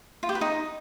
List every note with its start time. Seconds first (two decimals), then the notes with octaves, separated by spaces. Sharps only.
0.23 F4
0.29 G4
0.35 B4
0.41 D#4